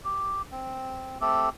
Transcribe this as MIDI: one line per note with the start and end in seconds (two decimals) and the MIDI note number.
0.05 0.42 67
0.52 1.18 60
1.21 1.49 57
1.21 1.49 60
1.21 1.49 67
1.21 1.49 69